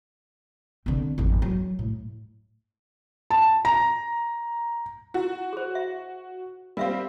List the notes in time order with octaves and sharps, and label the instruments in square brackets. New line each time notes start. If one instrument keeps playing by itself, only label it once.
[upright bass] D3 C4
G#1 F2
F#3
A2
[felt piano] A5
A#5
[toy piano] E4 [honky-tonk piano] F#4
[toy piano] G#4 C5
E5
[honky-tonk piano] G3 C4 [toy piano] A#4 E5 F5